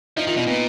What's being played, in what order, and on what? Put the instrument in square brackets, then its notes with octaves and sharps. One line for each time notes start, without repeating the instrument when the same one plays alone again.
[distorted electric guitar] F3 [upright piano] D#4
[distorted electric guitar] D#3 [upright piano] F4
[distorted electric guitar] B2 [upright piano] D#4
[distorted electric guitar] A#2 [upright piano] B3